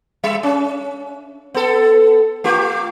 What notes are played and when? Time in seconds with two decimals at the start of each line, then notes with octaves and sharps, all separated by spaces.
0.24 G3 E5
0.43 C#4
1.54 B3 A4
2.44 A3 F4 G4